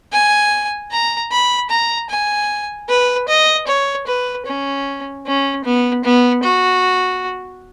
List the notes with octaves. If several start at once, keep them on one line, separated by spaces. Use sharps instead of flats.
G#5
A#5
B5
A#5
G#5
B4
D#5
C#5
B4
C#4
C#4
B3
B3
F#4